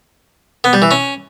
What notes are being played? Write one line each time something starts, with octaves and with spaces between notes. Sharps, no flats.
B3
G3
E3
C#4